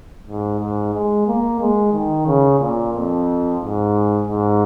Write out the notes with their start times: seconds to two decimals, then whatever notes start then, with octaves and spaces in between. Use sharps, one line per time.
0.27 G#2
0.60 G#2
0.94 G#3
1.27 A#3
1.60 G#3
1.93 D#3
2.26 C#3
2.60 A#2
2.94 F2
3.60 G#2
4.27 G#2